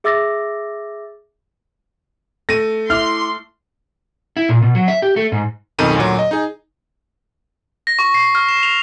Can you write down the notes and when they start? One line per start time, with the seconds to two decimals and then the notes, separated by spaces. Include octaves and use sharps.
0.04 G#4 E5 D6 E6 A6 A#6
2.49 A3 A#6 D#7
2.90 E4 E5 C6 D6 F6
4.37 E4
4.49 A#2
4.62 B2
4.75 F#3
4.88 E5
5.02 G4
5.16 A3
5.32 G#2
5.79 B1 F2 D#3 D#4 D#7
5.96 D2 A#2 F#3
6.19 D#5
6.31 D#4 G#4
7.87 A#6
7.99 C#6
8.14 C7
8.35 F6
8.49 E7
8.63 F7